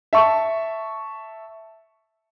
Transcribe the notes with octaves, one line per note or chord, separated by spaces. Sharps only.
E5 A5 C#6